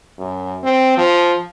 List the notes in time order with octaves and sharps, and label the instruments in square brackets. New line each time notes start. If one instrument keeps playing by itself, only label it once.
[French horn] F#2
C4
F3